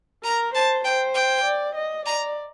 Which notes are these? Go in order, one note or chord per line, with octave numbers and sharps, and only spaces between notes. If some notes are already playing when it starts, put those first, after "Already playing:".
A#4 A#5
C5 A5
C5 G5
G5
D5
D#5
D5 A#5